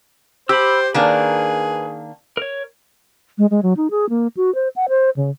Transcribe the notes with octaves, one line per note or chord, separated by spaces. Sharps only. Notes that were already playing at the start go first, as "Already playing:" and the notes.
G4 C5 B5 E6
D#3 A#3 D4 G#4 B4
A#4 C#5
G#3
G#3
F#3
D#4
G#4
A#3
F#4
C5
F#5
C5
C#3